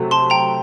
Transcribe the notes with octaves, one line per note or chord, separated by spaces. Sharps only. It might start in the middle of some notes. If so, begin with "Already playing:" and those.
Already playing: C3 F#3 A3
A5 C6
G5 A#5